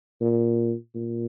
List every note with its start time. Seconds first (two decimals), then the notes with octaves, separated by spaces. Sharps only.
0.21 A#2
0.95 A#2